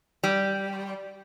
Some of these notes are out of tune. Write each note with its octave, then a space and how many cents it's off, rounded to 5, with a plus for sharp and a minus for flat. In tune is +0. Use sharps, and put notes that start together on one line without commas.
G3 -5